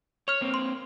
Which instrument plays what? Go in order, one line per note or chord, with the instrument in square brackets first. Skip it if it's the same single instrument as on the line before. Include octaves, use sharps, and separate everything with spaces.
[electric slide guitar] C#5 [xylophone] C#6 F6
[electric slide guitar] A#3 C4
[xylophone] C6